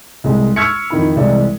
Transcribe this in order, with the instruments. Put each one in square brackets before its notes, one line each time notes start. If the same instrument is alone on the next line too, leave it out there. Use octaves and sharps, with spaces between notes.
[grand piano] C2 G#3
C#6 E6 F6 G#6 B6 C#7
F2 D#3 E4 B5
C2 E3 G#3 D5 E5